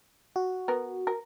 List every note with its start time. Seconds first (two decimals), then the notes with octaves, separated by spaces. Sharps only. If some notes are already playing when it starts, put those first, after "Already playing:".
0.36 F#4
0.68 B3 A#4
1.07 A#4